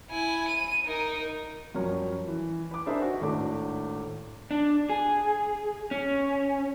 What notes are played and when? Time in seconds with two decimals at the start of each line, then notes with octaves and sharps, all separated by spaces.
0.10 E4 G#5
0.48 D#7
0.85 D#4 A#4
1.75 F#2 F3 G3 A#4 C#5
2.27 E3
2.71 B4 D6
2.86 D4 D#4 G#4 A#4 C5 E5
3.01 F#4
3.21 G#1 A2 A3 D4 D6
4.51 D4
4.89 G#4
5.91 C#4